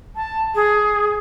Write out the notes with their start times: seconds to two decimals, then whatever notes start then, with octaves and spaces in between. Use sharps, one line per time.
0.16 A5
0.55 G#4